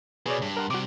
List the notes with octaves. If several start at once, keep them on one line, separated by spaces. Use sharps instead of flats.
B2 G#4 C#5 D5
G2
A#4 F#5 C6
C3 G3 F#4 D6